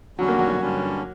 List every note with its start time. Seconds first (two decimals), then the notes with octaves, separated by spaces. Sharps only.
0.18 E2 D3 F#3 G3 C#4 F#4
0.28 A#3
0.39 F#3
0.50 F#3
0.61 G2 D3 G3 C#4